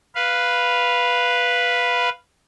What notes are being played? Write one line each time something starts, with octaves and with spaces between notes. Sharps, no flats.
B4 F5